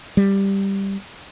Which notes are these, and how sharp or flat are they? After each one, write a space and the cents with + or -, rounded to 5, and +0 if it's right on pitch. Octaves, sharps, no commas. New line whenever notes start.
G3 +5